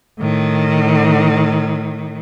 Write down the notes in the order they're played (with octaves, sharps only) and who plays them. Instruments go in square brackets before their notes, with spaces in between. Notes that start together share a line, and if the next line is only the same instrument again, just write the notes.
[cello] A2 D#3